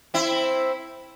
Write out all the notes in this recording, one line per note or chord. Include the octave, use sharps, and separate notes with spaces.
C4 E4